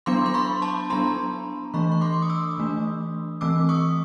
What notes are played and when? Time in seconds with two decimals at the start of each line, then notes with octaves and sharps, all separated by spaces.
0.06 F#3 B3 D4 C6 D6
0.26 C6
0.34 B5 C#6
0.62 A5 B5
0.90 F#3 B3 D4 A#5 C6
1.74 E3 A3 D4 B5 C#6
1.92 C#6
2.01 C6 D6
2.14 D6
2.22 D#6
2.30 D6 E6
2.58 E3 A3 D4
3.41 E3 A3 C4 D6 E6
3.69 C#6 D#6